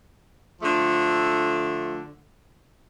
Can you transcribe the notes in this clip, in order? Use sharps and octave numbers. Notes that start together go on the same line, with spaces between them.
D3 F3 A3